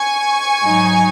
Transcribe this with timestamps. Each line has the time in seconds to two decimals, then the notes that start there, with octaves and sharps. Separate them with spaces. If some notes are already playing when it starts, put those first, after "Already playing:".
Already playing: G#5 C#6
0.62 G#2 F#3 D#4